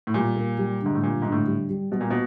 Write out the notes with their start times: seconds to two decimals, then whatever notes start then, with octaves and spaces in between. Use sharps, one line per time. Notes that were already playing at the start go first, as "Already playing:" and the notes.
0.07 A2
0.14 A#2 G3
0.36 A#3
0.58 G3
0.81 G#2 D3
0.95 A2
1.02 A#2 G3
1.22 G#2 D3
1.32 A2
1.47 G3
1.69 G3
1.91 B2 G3
2.01 A#2
2.10 B2